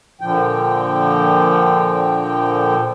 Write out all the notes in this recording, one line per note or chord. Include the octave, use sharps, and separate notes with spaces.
A#2 D3 F3 G5